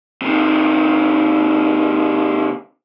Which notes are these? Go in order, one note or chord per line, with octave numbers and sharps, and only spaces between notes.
C3 D#3